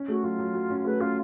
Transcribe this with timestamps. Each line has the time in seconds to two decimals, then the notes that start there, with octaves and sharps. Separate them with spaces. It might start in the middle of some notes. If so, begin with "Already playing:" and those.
Already playing: C#4
0.08 A3 F#4
0.23 F#3 F4
0.39 F#3
0.54 F#3
0.70 C#4
0.86 A3 B4
1.00 C#4 F4